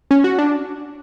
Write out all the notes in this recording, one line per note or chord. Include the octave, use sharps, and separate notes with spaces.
C#4
F#4
D4